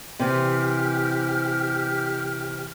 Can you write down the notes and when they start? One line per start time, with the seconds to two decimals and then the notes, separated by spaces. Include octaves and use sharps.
0.19 C3 E3 G4 F6